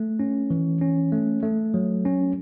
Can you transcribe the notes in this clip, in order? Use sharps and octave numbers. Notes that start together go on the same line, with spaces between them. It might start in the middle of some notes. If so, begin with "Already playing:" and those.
Already playing: A3
C#4
E3
C#4
A3
A3
F#3
C#4